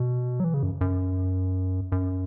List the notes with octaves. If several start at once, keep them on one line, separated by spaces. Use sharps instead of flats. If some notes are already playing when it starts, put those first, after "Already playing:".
Already playing: B2
F#3
E3
C#3
F#2
F#2
F#2